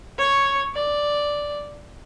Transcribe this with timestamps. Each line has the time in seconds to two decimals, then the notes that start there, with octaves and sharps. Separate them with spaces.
0.18 C#5
0.74 D5